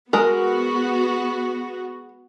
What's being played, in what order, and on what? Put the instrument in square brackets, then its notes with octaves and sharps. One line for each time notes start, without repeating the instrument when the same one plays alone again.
[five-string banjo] G#3 A#4 [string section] B3 F#4